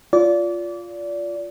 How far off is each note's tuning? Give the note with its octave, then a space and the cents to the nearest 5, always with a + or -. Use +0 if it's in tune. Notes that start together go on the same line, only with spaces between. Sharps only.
F4 +0 D5 -25